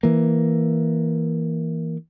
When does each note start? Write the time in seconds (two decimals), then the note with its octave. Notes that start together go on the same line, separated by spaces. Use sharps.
0.03 E3 A#3